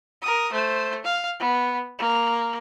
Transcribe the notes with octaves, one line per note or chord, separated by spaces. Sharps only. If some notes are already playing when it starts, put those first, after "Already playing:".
A#4 D#6
A3 C5
F5
B3
A#3